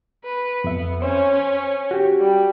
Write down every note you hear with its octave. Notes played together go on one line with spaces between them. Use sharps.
B4
F2 B3 E5
C#4 C5 C#5
F#4 G4
G3